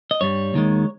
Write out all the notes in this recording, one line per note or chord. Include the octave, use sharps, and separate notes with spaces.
D#5
G2 G3 C#5
D#2 D#3 G#3